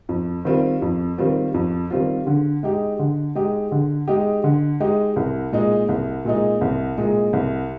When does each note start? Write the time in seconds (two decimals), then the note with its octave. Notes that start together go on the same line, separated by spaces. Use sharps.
0.09 F2
0.45 D#3 G3 C4 F4
0.82 F2
1.18 D#3 G3 C4 F4
1.54 F2
1.90 D#3 G3 C4 F4
2.27 D3
2.63 G#3 D#4 G4
2.99 D3
3.35 G#3 D#4 G4
3.72 D3
4.08 G#3 D#4 G4
4.44 D3
4.80 G#3 D#4 G4
5.16 C2
5.52 A#2 G#3 D#4
5.89 C2
6.25 A#2 G#3 D#4
6.61 C2
6.97 A#2 G#3 D#4
7.33 C2